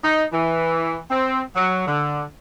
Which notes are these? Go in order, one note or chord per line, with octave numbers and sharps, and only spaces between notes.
D#4
E3
C4
F#3
D3